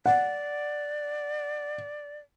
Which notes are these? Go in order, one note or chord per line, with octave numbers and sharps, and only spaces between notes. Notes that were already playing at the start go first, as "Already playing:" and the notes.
D5 F#5